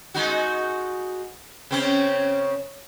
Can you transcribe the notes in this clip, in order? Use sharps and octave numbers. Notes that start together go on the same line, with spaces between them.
G#3 D#4 F#4
C#3 C4 C#4